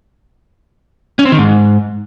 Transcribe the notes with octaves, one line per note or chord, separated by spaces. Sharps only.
C#4
C4
D#3
G#2